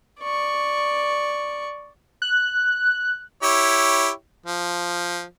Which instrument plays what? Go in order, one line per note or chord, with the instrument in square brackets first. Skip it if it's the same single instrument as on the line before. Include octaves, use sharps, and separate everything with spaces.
[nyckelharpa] D5 C#6
[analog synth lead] F#6
[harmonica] E4 G4 C#5
F3